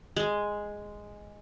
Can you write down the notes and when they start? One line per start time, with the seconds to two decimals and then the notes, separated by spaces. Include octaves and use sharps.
0.16 G#3